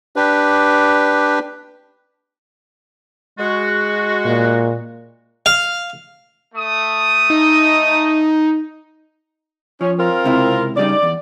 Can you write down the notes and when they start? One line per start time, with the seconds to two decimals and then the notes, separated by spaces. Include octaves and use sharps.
0.16 D4 G4 B4
3.39 G#3 F#4
4.25 A#2
5.46 F5
6.55 A3 D#6
7.30 D#4
9.81 F3 C#4
9.99 C4 F4 A#4
10.24 C#2 C3 E4
10.77 C#3 G3 D#4 D5
11.03 E2